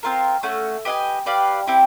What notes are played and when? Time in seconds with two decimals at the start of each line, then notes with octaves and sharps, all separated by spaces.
0.03 C4 F4 A#4
0.43 A3 C#4 F#4
0.85 G4 B4 D#5 G#5
1.26 G4 B4 D5 F5
1.67 C4 E4 G4